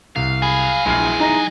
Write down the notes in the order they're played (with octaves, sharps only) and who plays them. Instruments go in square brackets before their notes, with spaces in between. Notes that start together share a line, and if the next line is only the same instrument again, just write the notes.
[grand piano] C2 [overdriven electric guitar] F5
[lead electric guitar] F#3 G#4 [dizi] B5
[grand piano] A#1 F6 C7 [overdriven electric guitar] E3 G#3
[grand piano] D#4 [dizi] A#5